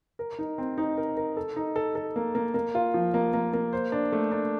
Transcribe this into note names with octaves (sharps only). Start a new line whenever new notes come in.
A#4
D#4
C4
D#4
A#4
A#4
A4
D#4
A4
A4
A#3
A#3
A#3
F4
F3
A#3
A#3
A#3
C5
D4
A3
D4